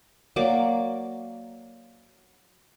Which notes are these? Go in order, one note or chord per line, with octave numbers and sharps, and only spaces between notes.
F#3 A#3 D5 D6